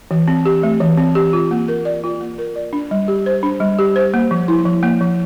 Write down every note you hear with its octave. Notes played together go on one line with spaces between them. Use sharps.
E3
C4
G4
A3
E3
C4
G4
F4
A#3
A#4
D5
F4
A#3
A#4
D5
D4
G3
G4
C5
D4
G3
G4
C5
A#3
F3
E4
F3
A#3
F3